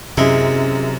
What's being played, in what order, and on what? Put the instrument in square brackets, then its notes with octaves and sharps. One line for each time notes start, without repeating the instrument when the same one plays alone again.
[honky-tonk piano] F#2 [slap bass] C3 [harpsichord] G#3 E4